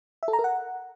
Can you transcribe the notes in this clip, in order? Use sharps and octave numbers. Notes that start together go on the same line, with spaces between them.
E5
A4
A#5
A#4
F#5